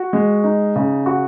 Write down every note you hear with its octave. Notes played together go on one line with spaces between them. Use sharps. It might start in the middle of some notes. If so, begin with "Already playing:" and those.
Already playing: F#4
G#3
D#4
C#3
F#4